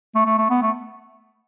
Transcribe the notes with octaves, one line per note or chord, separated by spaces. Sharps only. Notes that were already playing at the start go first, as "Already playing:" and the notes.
A3
A3
A3
B3
A3